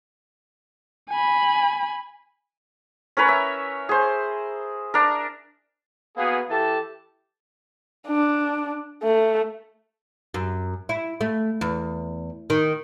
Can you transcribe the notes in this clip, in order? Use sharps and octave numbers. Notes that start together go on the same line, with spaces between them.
G#5 B5
C#4 A#4 B4 C#5
E5
G#4 C5
D4 A#4
A#3 B3 F#4 G#4
E3 G4 A4 A5
D4
A3
F#2
E4
A3
E2
D#3